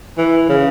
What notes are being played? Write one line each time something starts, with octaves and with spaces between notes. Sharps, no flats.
E3
C#3